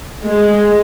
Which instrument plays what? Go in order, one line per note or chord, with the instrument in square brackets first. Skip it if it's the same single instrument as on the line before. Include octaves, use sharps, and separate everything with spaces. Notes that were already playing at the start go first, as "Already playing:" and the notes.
[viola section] G#3